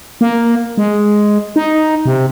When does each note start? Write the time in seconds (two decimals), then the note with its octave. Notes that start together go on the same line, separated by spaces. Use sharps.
0.21 A#3
0.78 G#3
1.56 D#4
2.06 C3